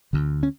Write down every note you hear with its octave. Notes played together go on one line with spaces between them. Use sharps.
D2 D3
C#4